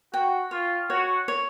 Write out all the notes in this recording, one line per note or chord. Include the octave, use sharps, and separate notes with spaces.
F#4 G5
F4 C#5
F#4 C#5
C#5